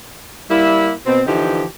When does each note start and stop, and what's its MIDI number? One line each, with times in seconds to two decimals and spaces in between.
0.50 0.91 55
0.50 0.91 58
0.50 0.91 64
1.06 1.21 47
1.06 1.21 60
1.26 1.65 50
1.26 1.65 52
1.26 1.65 53
1.26 1.65 63
1.26 1.65 67